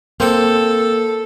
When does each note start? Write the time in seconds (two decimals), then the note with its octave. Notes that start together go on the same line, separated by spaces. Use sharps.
0.20 A#3 C4 A4 G5